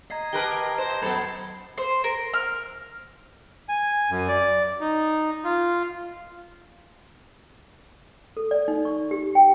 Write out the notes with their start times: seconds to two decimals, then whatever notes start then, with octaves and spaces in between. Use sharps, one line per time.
0.11 D#5 A#5 G#6 C7
0.33 G4 A#4 B4 A5 G7
0.78 C5
1.02 F#2 B3 A4 B5 G#6 C7
1.78 C5
2.04 A#4
2.34 F6
3.69 G#5
4.10 F#2
4.28 D5
4.81 D#4
5.44 F4
8.37 A4
8.51 D5
8.68 D#4
8.85 C#6
9.11 G4
9.35 G5